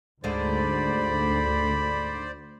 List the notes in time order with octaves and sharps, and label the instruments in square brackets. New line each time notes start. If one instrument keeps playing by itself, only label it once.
[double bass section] D2 [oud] G#2 D3 G#3 [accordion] C5 D5 [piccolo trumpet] B5